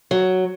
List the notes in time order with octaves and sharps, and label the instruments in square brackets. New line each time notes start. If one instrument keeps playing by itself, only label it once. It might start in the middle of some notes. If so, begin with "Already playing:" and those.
[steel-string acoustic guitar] F#3